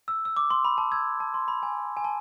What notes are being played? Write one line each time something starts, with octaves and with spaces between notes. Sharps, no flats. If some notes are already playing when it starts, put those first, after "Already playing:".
E6
E6
D6
C6
B5
A5
E6 G#6
A5
C6
B5
G#5
G#5
A5